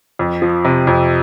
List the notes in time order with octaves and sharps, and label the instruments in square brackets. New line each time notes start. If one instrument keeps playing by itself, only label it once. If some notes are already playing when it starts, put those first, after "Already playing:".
[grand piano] F2
F3
C3
F2